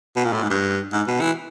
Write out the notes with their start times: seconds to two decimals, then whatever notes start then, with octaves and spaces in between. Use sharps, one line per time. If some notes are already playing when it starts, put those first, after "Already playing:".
0.16 B2
0.24 A#2
0.33 A2
0.42 G#2
0.50 G2
0.92 G#2
1.07 B2
1.21 E3